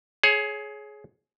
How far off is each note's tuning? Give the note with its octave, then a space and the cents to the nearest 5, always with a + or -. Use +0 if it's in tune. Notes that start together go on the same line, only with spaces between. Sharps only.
G#4 +20 C#5 +0